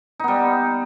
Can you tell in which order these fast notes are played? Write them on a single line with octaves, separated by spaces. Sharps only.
D#4 B3 G3